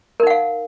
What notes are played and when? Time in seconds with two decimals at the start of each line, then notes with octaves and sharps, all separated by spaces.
0.20 A#4
0.23 D#4
0.27 F#5
0.30 F5